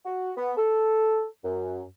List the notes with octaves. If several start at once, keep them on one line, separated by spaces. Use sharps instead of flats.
F#4
B3
A4
F#2